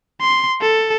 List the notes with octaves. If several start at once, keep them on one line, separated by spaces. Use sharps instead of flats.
C6
A4